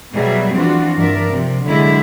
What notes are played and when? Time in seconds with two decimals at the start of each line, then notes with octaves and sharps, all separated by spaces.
0.14 B2 F#3 G3 G#4 E5
0.54 E3 F3 C4 D4 F4 F#4
0.96 G2 D4 A#4 D5 E5
1.30 C3 F3
1.66 D3 F#3 G#3 E4 G#4 E5